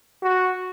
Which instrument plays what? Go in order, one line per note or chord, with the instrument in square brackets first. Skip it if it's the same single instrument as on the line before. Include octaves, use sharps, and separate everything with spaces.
[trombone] F#4